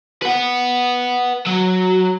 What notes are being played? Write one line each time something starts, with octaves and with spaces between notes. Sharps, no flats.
B4 F#5
F#3